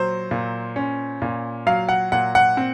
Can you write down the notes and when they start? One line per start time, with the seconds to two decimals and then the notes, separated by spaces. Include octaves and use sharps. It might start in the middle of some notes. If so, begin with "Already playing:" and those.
Already playing: A#2 F#3 C5
0.31 A#2
0.76 C#4
1.22 A#2
1.67 F#3 F5
1.89 F#5
2.12 A#2 F#5
2.35 F#5
2.57 C4